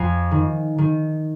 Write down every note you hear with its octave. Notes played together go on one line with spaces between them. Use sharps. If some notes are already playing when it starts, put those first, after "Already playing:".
Already playing: F2 F5 G#5
D#3
D#3